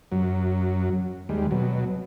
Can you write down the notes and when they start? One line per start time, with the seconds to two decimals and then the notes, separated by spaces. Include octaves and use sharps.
0.12 F#2 F#3
1.29 D#2 G3 G#3
1.51 B2 F#3